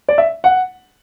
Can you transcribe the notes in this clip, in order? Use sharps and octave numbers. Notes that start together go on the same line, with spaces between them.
D5
E5
F#5